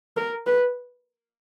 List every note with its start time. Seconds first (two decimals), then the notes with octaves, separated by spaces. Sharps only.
0.17 A#4
0.47 B4